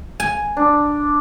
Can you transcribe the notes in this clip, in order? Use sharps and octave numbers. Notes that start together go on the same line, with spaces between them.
G#5
D4